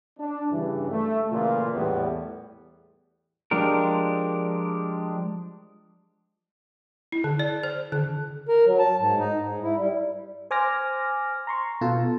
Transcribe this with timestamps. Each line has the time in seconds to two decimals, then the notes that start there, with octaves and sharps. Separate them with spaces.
0.19 D4
0.50 G2 C#3 E3
0.90 A3
1.31 A#2 C#3 E3 F4
1.74 E2 A2 E3 G3 B3
3.51 F3 G#3 D4 G4 A#4
7.12 E4
7.24 D3
7.39 D5
7.63 C5
7.92 D3
8.49 A#4
8.66 F#3
8.79 A5
9.00 G#2
9.18 D#4
9.40 G#2
9.63 E4
9.77 G3
10.51 C5 G#5 D6 F6 A#6
11.47 A#5 C6 C#6
11.81 B2 F4 A4 A5